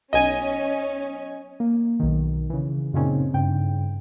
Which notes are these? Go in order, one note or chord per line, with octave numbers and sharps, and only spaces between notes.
B1 C#4 D#5 G#5 D#7
A#3
B1 D#3
C#3 E3
F#2 A#2 C#3 C4 C#4 D#4
G2 C#3 G5